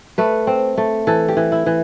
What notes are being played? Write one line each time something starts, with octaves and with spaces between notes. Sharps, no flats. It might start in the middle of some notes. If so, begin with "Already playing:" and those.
A3 B4
C4
A3
E3 A4
G4
E3
E4
E3